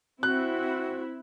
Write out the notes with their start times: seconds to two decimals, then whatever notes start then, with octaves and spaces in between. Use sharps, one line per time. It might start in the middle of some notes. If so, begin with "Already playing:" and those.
0.23 C4 E4 F#4 F#6